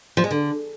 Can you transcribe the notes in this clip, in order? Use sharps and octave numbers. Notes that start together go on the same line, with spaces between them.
F3
G#3
D3